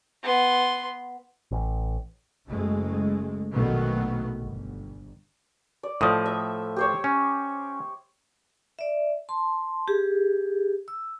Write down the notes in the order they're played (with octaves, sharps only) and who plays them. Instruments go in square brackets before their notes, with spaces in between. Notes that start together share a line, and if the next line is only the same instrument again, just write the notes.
[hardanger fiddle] B3 C6
[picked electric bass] A1
[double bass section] F#1 G#3 A3
A#1 B2 D#3 F#3 A3 B3
G1
[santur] D5
[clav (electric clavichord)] A2 F3 [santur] D#5
[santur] E5
G4 C5 C#5
[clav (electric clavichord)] C#4
[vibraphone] D5 E5
A5 C6
G4 G#4
E6